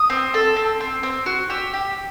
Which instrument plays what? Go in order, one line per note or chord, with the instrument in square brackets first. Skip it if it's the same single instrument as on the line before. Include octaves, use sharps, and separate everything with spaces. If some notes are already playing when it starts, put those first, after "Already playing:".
Already playing: [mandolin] D#6
C4
A4
C4
C4
C4
F#4
G4 E6
G4